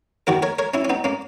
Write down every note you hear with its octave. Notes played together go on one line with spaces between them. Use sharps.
D#2 D#3 F#4 A#4
A#4 C#5
A#4 C#5
C#4 E4
C#4
B3 D#4
A#3 C#4